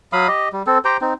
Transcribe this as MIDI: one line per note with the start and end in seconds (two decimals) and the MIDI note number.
0.13 0.28 54
0.13 0.28 77
0.13 0.28 83
0.13 0.28 87
0.28 0.49 67
0.28 0.49 75
0.53 0.63 55
0.67 0.78 60
0.67 0.78 69
0.85 0.97 67
0.85 0.97 72
0.85 0.97 79
0.85 0.97 82
1.01 1.14 60
1.01 1.14 63